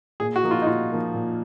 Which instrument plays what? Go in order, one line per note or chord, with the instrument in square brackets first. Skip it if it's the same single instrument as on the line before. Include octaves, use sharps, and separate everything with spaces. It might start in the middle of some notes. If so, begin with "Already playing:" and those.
[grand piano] A#2 [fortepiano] G#4
[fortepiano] F#4
[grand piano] F3 A#3 D#4
[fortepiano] F4
D#4
[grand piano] A#2 [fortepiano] F4
[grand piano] F3 A#3 D#4
A#2